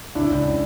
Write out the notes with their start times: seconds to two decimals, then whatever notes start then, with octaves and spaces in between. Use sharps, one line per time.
0.15 C#2 D4 E4
0.31 C#2
0.45 C#3